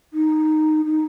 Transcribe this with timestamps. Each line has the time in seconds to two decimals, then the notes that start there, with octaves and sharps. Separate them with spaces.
0.12 D#4
0.85 D#4